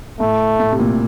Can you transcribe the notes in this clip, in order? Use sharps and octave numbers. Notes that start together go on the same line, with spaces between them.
A2 A3
A2
C3
A#2